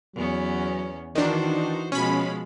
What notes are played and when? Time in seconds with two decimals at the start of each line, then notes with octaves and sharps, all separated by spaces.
0.15 E2 F#3 B3 C#4
1.15 D#3 E3 D4 D#4 F#4 C5
1.92 B2 F3 G#3 C#4 B5